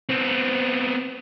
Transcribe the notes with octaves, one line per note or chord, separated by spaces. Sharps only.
B3 C4